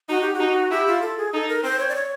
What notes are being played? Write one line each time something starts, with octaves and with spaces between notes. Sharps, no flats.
D#4 F#4
G4
F#4
D#4
E4 G4
F4
A4
G#4
D#4 A4
A#4
C4 C5
C#5
D5
C#5